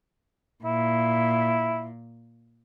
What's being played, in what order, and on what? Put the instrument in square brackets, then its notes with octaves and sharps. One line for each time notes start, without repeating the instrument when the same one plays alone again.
[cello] A#2 [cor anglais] E4